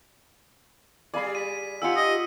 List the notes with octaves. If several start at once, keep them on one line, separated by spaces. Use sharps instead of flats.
G3 G#4 D5 F5 B5
B6 D#7
D#4 F4 G4 F#5 G#5 E6 C#7
D#5